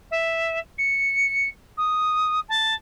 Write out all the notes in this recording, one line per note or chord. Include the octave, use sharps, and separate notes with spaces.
E5
C#7
D#6
A5